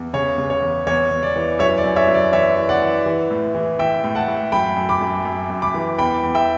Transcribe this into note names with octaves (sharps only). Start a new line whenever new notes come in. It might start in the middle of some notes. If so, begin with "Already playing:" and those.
Already playing: E2
C#3 C#5
C#3
C#5
E2
E2 C#5
E2
D5
E3
F#2 C#5 E5
D5
F#2
C#5 E5
F#2
D5
E3 C#5 E5
E3
D5 F#5
E3
E3
A2
E3
E3 E5 G5
A2
F#5 A5
A2
F#2 G5 B5
F#2
B5 D6
F#2
F#2
F#2
B5 D6
E3
E2 G5 B5
E2
E5 G5